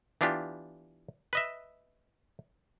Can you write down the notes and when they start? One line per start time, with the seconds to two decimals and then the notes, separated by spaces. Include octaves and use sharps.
0.21 E3 B3 D4 F4 G4
1.33 B4 D#5 E5